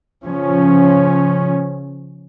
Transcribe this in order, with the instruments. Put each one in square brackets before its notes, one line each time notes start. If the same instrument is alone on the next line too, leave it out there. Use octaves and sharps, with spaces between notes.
[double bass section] C#3 F3 C#4